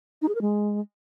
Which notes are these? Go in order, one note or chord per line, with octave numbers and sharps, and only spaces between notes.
D#4
G#4
A#4
G#3